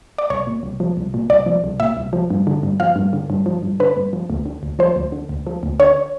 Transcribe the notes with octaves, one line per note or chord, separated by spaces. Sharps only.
D5
C2 C#5
A#2
C2
F3
C2
A#2
C2 D5
F3
C2
A#2 E5
C2
F3
G2
D3
G2
F3 F5
G2
D3
G2
F3
G2
D3 B4
G2
F3
D2
D3
D2
F3 C5
D2
D3
D2
F3
D2
D3 C#5